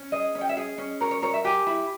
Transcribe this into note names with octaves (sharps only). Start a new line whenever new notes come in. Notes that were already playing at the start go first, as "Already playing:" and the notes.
Already playing: C#4
G#4 D#5
C#4
G5
E5
G#4 D#5
C#4
A#4 C#5
C#5
A#4 C#5
E5
G4 G#5
E4